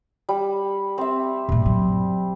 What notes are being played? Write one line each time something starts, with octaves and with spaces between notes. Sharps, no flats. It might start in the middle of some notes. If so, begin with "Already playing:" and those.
G3
C4 E5
G2 A#2
F#3